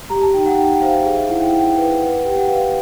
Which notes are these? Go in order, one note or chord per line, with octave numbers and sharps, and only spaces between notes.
G4 A#5
A5
D#4 G5
F#5
D#4 G5
F#5
C5 F5
E5
G#4 F5
E5
E4 F#5
G5
E4 G5
B4
B4 F#5
G4 G5
F#5
B4 F5